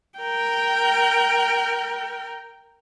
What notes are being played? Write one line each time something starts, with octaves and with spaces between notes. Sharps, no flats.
A#4 G5